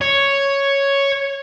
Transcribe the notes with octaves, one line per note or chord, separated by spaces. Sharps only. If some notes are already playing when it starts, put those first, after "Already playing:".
C#5